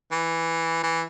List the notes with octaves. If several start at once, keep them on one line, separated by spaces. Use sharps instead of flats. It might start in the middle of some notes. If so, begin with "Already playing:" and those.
E3
E3